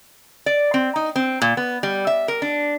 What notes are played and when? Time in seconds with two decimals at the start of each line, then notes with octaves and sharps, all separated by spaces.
0.46 D5
0.74 C4
0.96 D#4
1.16 C4
1.42 A#2
1.57 B3
1.83 G3
2.07 E5
2.28 A#4
2.42 D4